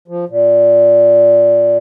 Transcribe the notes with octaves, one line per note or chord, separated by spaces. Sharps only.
F3
A#2